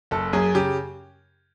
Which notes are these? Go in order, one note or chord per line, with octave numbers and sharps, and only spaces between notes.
F#1 A4
F#2 G#4
C#3 G4